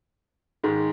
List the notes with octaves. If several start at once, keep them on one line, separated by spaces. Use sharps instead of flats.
G#2 D#3 G#3